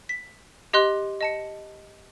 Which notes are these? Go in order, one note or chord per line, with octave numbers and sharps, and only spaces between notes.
B6
G4 D#5 C6 F#6
D#5 A5 C#7